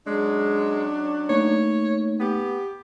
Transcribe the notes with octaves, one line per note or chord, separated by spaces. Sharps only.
F#3 G#3 C#4 D4
A3 A#3 D#4 C#5
B3 G4